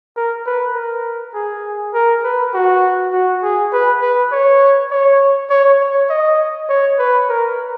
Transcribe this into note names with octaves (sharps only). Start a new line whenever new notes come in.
A#4
B4
A#4
G#4
A#4
B4
F#4
F#4
G#4
B4
B4
C#5
C#5
C#5
C#5
D#5
C#5
B4
A#4